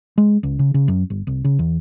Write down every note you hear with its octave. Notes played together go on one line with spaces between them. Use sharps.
G#3
C#2
C#3
C#3
F#2
G1
C2
C#3
E2